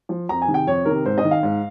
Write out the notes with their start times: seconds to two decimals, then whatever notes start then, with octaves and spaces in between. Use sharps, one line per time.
0.09 F3
0.29 F2 A#5
0.42 G#5
0.48 C3 D#3
0.54 G5
0.67 F2 C#5
0.85 C3 D#3 A#4
1.05 G#2 C5
1.18 D#5
1.24 D#3
1.31 F5
1.43 G#2